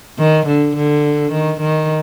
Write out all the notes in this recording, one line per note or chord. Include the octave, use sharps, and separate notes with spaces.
D#3
D3
D3
D#3
D#3